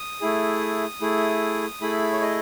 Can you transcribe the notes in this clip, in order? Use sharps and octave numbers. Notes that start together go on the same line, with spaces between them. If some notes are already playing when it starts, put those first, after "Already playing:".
Already playing: D#6
A3 E4 G#4
A3 E4 G#4
A3 E4 G#4 B5
C#5
D#5